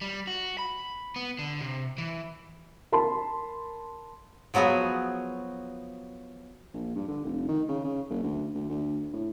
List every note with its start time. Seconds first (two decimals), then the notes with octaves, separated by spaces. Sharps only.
0.01 G3
0.27 F#4
0.58 B5
1.16 B3
1.39 D3
1.60 C3
1.98 E3
2.92 A#4 A5 B5 C6
4.54 F3 F#3 B3 F#4 G#4
6.74 A#1
6.96 G2
7.08 D3
7.24 F1
7.49 D#3
7.69 C#3
7.85 C#3
8.10 F#1
8.23 D2
8.55 D2
8.70 D2
9.13 A2